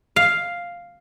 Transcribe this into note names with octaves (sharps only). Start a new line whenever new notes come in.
F5